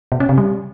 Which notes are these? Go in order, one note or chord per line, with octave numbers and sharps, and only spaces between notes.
B2
C#4
C3
G3